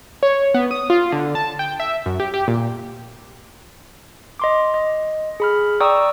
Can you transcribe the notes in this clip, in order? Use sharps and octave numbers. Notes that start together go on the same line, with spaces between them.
C#5
B3
D#6
F4
D3
A5
G5
E5
F#2
G4
G4
A#2
D#5 C6 D6
D#5
G#4 B5 F6
D5 G5 A#5 C#6 D#6 E6